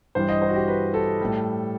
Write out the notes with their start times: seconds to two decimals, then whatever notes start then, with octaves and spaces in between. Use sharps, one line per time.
0.15 G2 E3 G3 C5
0.29 D#5
0.42 C5
0.49 F#4
0.55 G4
0.68 B4
0.94 A4
1.21 A2 G3